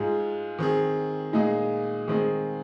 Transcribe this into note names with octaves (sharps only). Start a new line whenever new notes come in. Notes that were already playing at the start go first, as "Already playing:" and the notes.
Already playing: G#2 G#3 F4 G#4
D#3 C4 G#4
A#2 G#3 D#4 G#4
D#3 G#3 C4 G#4